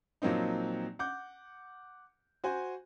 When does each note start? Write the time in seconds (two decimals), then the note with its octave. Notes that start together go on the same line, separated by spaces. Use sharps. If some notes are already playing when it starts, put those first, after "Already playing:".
0.22 A#2 F3 F#3 A#3 C4 D#4
0.99 F#5 D6 G6
2.44 F#4 C5 G#5